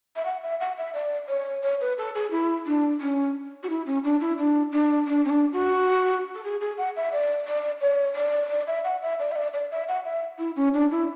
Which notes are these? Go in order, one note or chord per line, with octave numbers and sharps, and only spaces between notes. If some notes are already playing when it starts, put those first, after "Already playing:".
E5
F#5
E5
F#5
E5
D5
C#5
C#5
B4
A4
G#4
E4
D4
C#4
F#4
E4
C#4
D4
E4
D4
D4
D4
C#4
D4
F#4
A4
G#4
G#4
F#5
E5
D5
D5
C#5
D5
D5
E5
F#5
E5
D5
E5
D5
D5
E5
F#5
E5
E4
C#4
D4
E4